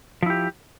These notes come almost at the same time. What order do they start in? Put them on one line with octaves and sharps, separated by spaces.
F3 E4 G4